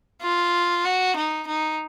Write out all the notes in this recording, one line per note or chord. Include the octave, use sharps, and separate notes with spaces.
F4
F#4
D#4
D#4